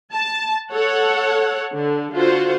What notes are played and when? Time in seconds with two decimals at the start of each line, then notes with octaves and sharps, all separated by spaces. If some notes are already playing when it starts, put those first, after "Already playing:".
0.13 A5
0.71 A4 C#5 F#5
1.72 D3
2.13 D3 F4 F#4 C5